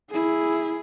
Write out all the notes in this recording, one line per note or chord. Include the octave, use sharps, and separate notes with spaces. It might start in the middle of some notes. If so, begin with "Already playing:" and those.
E4 G#4